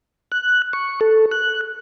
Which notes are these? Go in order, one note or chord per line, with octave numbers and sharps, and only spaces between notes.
F#6
C#6
A4
F#6